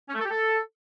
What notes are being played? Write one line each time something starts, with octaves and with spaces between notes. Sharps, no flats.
C#4
A3
A4
G4
A4